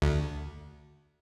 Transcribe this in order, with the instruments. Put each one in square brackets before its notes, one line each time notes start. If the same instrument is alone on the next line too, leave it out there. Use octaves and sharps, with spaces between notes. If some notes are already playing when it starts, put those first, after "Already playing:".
[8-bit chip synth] D2